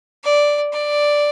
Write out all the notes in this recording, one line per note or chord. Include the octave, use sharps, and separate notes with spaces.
D5
D5